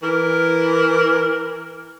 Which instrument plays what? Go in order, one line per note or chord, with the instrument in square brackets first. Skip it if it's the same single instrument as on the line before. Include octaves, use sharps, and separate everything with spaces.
[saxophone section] E3 A#4